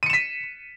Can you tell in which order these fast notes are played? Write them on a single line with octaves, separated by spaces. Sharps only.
D#7 C#7 E7 B6